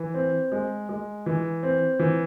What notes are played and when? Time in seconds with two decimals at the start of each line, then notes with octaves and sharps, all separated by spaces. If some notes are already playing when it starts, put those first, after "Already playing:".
Already playing: E3
0.14 C4
0.52 G#3
0.89 G#3
1.26 E3
1.63 C4
1.99 E3